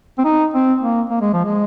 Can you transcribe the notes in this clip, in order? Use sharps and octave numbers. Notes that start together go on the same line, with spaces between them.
C4
D#4
C4
A#3
A#3
G#3
F3
G#3